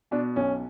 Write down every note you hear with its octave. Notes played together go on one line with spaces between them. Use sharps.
B2 D4
B1 C#4